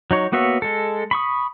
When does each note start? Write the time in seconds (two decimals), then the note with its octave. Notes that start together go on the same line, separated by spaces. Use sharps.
0.11 F#3 D#4 C#5
0.32 A#3 B3 F#4 C#5 E5
0.62 G#3 A4
1.11 B5 C#6 D#6